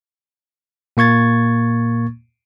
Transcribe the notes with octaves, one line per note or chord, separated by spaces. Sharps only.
A#2 A#3 C#6 G#6 A6